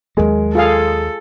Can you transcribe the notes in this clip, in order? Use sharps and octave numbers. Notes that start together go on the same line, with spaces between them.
D#2 F#3 G#3 A#4
F4 G#4 A4 F5